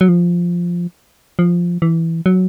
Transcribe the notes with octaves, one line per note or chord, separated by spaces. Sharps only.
F#3
F3
F3
E3
F#3